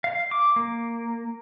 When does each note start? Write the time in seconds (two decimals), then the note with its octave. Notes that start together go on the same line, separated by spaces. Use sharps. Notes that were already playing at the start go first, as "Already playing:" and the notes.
0.04 F5
0.31 D6
0.56 A#3